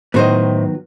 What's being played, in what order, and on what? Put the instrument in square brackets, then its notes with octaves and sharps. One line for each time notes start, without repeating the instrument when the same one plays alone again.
[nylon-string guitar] A2 C5 D#5 [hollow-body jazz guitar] D#3 F#3 B3